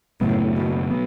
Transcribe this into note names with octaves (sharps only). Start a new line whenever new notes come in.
F#2 A2 C#3 F#3 B3
B2
F#3 B3